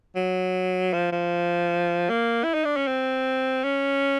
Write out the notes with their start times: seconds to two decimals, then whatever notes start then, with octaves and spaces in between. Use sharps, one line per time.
0.16 F#3
0.93 F3
1.12 F3
2.10 A#3
2.44 E4
2.54 D#4
2.65 D4
2.77 C#4
2.87 C4
3.64 C#4